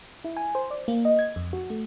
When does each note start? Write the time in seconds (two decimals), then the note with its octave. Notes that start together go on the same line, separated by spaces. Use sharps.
0.24 E4
0.37 G#5
0.55 C5
0.70 D5
0.88 A#3
1.05 D#5
1.19 G#6
1.36 F2
1.53 F#4
1.70 A3